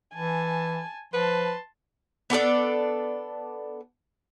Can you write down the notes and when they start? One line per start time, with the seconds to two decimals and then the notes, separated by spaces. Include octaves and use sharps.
0.15 E3 G#5 A5
1.14 F3 B4 A5 C6
2.30 B3 D4 A4 D5